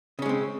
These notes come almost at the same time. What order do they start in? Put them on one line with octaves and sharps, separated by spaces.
C#3 C#4 G#3 C4